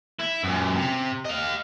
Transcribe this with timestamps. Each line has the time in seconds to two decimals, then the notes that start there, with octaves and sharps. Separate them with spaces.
0.19 E4
0.44 F#2 A#2
0.76 C3
1.25 D#5 F5